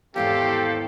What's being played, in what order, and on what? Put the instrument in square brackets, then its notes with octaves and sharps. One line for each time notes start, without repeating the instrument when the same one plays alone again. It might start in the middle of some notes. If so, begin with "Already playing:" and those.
[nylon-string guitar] E2 G#2 D#3 [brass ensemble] A3 C4 A4 [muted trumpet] G4 [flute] F5